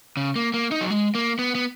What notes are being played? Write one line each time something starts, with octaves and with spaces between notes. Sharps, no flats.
C#3
A#3
A#3
D#4
F#3
G#3
A#3
B3
B3